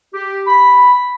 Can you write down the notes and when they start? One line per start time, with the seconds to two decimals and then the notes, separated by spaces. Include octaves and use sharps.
0.13 G4
0.47 B5